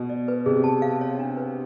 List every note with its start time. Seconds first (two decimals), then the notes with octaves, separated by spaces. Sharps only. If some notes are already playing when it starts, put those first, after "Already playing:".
Already playing: B2
0.10 D5
0.28 B4
0.46 C3 G#4
0.64 A5
0.82 F5
1.01 C#5
1.19 D4
1.37 B4